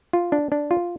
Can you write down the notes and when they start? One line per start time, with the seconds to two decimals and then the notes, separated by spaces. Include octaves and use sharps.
0.13 F4
0.32 D4
0.52 D4
0.71 F4